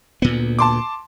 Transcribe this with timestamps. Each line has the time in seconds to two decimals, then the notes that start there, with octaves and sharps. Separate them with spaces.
0.22 D2 A#2 B3
0.59 A5 C6 D6